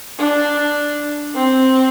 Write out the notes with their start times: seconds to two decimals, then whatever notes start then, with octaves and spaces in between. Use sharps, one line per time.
0.18 D4
1.34 C4